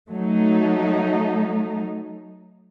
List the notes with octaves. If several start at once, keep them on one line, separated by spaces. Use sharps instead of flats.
F#3 A3 D#4